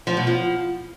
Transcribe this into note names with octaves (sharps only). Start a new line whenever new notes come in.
F3
B2
F3